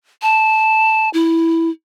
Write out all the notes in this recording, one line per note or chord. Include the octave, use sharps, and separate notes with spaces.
A5
E4